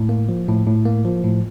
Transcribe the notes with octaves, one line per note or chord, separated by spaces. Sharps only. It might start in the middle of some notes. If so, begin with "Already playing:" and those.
Already playing: A2
A#3
F3
A2
A2
A#3
F3
A2